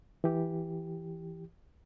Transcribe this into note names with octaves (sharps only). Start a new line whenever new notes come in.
E3 G4